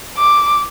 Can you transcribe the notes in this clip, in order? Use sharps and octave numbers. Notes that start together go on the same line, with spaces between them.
D6